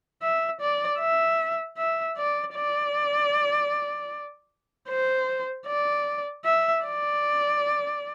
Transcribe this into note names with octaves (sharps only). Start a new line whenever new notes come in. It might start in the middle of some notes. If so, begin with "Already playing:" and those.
E5
D5
E5
E5
D5
D5
C5
D5
E5
D5